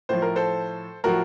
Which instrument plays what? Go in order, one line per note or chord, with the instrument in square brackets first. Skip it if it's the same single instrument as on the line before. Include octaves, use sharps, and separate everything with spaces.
[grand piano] A2 F3 C5
A#4
A4 C5
A2 F3 F#4 A#4